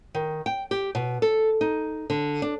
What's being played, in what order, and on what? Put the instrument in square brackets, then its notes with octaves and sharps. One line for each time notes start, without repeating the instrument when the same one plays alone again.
[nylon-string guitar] D#3
G5
G4
B2
A4
D#4
D3
D4